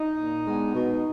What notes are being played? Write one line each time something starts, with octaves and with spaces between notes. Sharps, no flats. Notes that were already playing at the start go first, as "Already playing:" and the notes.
Already playing: D#4
A#2
G#3 B3 D4
B2